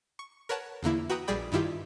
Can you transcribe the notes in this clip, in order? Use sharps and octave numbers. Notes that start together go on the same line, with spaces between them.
C#6
A#4 B4 C#5 F#5 A5
E2 D3 A#3 E4
F#4 B4 G5 A#5 D#6 F#6
A#1 G3 G#4 D5 G5 B5
G2 D#3 E4 F4 G4